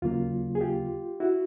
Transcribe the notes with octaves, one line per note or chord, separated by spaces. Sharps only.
D#2 C#3 F#3 A#3 F4
G#4
F4 G4
E4 F#4